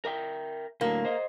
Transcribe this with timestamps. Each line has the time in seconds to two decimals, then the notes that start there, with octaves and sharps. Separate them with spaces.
0.05 A#4 E5 G5
0.81 A2 D3 F#3 A#3
1.05 C5 D#5